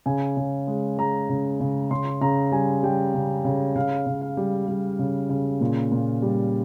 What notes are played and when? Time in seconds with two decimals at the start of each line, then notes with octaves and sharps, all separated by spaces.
0.06 C#3 G#5
0.37 C#3
0.67 G#3
0.98 G#3 A#5
1.30 C#3
1.60 C#3
1.91 C#3 C6
2.21 C#3 A#5
2.52 G3 G#5
2.83 G3 G5
3.14 C#3
3.45 C#3
3.76 C#3 F5
4.06 C#3
4.21 F5
4.37 G3
4.68 G3
4.99 C#3
5.29 C#3
5.61 A#2
5.92 A#2
6.22 G3